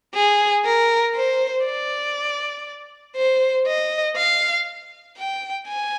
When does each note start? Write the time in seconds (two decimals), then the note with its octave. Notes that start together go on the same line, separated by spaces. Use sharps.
0.14 G#4
0.65 A#4
1.15 C5
1.65 D5
3.16 C5
3.67 D#5
4.17 F5
5.17 G5
5.68 G#5